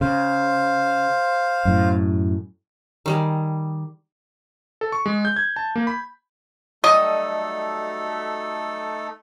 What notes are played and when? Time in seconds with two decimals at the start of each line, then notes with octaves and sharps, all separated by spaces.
0.01 C#3 C5 F5
1.65 F#2 A2
3.06 D#3 G3 G#4
4.81 A4
4.92 C#6
5.06 G#3
5.25 G6
5.36 G#6
5.56 A5
5.76 A#3
5.87 B5
6.84 F#3 G3 A3 D#4 A4 D#5